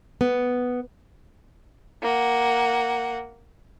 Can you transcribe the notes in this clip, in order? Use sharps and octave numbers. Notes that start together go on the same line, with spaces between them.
B3
A#3 F#5